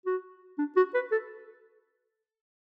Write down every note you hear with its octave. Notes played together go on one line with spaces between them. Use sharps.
F#4
D4
F#4
B4
A4